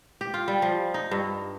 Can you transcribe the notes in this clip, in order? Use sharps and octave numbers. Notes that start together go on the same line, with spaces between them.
G4
F4
G3
F3
D#4
G2